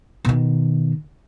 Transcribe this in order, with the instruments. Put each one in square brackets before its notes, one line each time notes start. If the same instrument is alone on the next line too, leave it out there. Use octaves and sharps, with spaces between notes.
[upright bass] B2 D#3